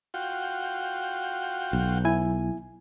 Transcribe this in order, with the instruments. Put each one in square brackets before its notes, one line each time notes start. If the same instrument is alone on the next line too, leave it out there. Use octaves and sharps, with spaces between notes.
[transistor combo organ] F4 F#4 G5
[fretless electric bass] B1
[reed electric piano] E4 G#5